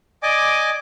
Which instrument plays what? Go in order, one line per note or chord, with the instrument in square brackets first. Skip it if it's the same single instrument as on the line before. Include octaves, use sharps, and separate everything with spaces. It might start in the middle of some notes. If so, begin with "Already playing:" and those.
[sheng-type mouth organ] D5 D#5 G#5 D6